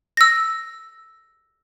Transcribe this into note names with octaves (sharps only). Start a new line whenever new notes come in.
E6 A#6